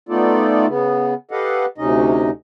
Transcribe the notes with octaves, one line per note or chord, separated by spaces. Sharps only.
A3 B3 D#4 F4 A4 D5
C#3 B3
G4 A4 B4 D#5 F5 F#5
D2 C3 C#4 D#4 D#5